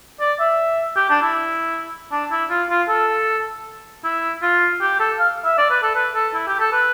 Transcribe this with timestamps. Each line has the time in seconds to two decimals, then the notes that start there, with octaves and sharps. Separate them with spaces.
0.20 D5
0.39 E5
0.97 G4
1.10 D4
1.22 E4
2.12 D4
2.31 E4
2.50 F4
2.69 F4
2.89 A4
4.04 E4
4.42 F4
4.81 G4
5.00 A4
5.19 F5
5.45 E5
5.58 D5
5.70 B4
5.83 A4
5.95 B4
6.15 A4
6.34 E4
6.47 G4
6.59 A4
6.72 B4